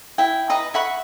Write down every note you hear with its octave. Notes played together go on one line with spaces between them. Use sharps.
E4 G5
B4 D#5 A#5
E5 F#5 B5 C#6